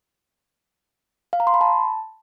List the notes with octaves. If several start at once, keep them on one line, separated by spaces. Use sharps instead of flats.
F5
A#5
C6
B5
A5